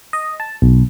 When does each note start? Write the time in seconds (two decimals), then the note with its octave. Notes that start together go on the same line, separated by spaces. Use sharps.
0.13 D#5
0.40 A5
0.62 B1